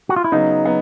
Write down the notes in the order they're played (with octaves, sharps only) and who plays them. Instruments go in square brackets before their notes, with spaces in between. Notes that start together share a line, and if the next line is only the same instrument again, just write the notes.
[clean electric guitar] F#4
F4
E4
[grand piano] C#3 F#3 B3 [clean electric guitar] D#4
[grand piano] F#3 B3